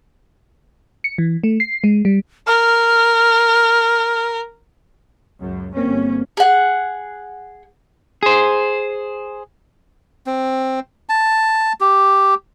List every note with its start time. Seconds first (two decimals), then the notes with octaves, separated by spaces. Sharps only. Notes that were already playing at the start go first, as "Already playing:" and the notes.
1.04 C#7
1.18 E3
1.44 A3
1.60 C7
1.84 G#3
2.05 G3
2.47 A#4 F6
5.39 C#2 F#2
5.77 G1 A#3 C4 C#4
6.37 G#4 F#5
8.23 G#4 C5
10.27 C4
11.09 A5
11.81 G4